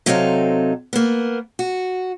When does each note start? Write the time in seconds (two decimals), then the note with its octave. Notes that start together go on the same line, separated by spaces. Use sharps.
0.06 C3 F#3 C4 D#4 A4 F5
0.93 A#3 B3
1.59 F#4